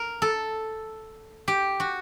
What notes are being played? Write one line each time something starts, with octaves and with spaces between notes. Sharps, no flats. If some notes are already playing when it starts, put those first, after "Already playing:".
Already playing: A#4
A4
G4
F#4